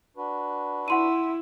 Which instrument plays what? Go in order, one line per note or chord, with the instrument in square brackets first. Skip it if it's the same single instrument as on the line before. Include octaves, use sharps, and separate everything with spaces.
[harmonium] D4 F#4 B4
[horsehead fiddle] E4 [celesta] F#5 C6 D#7